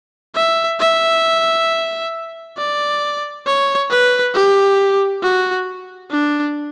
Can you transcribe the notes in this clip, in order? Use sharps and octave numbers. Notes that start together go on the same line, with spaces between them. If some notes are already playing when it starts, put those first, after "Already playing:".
E5
E5
D5
C#5
B4
G4
F#4
D4